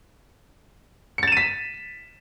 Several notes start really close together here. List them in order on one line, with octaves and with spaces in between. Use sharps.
C#7 A6 E7 D#7 B6